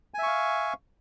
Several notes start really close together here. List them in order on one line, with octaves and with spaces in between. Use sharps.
G#5 E5 C#6 F5